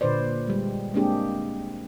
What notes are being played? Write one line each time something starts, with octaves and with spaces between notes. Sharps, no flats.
A#2 D3 B4 C5 D5
G3 G#3
G#3 A#3 C4 D4 G4 G#4